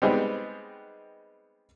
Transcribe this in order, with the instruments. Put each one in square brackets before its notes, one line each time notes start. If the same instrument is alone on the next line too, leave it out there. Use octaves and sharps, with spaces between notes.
[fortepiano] G3 G#3 B3 C4 D#4 G#4